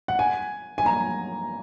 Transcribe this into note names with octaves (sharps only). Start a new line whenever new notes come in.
F#5
G#5
G#5
A#5